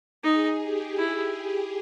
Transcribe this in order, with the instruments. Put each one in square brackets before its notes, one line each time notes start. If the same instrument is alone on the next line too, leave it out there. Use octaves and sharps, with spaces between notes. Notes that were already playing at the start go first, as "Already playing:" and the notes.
[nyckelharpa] D#4 [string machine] G#4
[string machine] G4
[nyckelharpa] E4